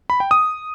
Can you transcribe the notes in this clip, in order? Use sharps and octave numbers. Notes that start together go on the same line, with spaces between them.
B5
G5
D#6